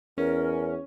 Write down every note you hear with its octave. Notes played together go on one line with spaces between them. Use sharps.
E2 C#4 A#4